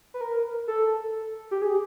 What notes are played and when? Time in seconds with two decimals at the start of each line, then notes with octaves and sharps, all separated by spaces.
0.14 B4
0.21 A#4
0.68 A4
1.51 G4
1.62 G#4